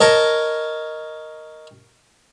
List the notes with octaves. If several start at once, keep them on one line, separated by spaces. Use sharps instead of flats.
A#4 C#5 D#5 A5